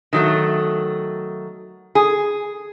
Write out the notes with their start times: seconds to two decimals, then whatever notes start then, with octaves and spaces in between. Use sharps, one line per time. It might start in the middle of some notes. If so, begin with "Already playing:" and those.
0.13 D#3 F#3 A3
1.95 G#4